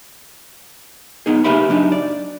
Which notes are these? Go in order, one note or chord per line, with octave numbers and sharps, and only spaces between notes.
B3 D#4 G#4
C#3 A#3 G4 B4 E5 B5
F#2 D4 D#4
D5